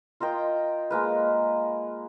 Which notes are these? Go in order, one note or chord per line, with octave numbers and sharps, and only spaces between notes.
F4 A#4 D#5 G5
G#3 A#3 B4